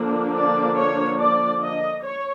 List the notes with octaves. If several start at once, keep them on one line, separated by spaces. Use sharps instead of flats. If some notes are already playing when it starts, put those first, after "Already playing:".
Already playing: D3 F3 A#3 D4
D5
C#5
D5
D#5
C#5